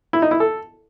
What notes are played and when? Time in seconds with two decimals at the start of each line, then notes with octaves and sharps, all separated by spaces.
0.13 E4
0.22 D#4
0.31 E4
0.40 A4